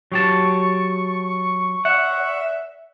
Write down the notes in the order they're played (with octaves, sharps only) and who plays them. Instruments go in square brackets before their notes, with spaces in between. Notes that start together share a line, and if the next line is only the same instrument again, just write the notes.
[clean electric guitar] F#3 G4 A5 [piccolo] C#6
[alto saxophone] E5 [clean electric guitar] F#5